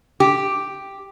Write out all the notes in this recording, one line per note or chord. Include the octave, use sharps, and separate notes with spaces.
G4